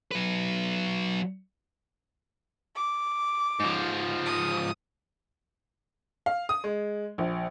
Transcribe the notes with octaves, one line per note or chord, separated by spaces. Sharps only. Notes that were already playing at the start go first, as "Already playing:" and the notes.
F#3 B4
D6
G#2 F3
D#6
F5
D#6
G#3
A#1